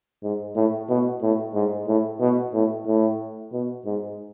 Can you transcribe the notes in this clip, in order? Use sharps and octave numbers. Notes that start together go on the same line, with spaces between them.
G#2
A2
B2
A2
G#2
A2
B2
A2
A2
B2
G#2